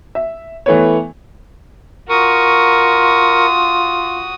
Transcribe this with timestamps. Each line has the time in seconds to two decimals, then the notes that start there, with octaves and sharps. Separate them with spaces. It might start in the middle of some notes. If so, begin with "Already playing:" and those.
0.15 E5
0.66 E3 A3 B3 C#5
2.09 F4 F#4 A#4 C#6 D#6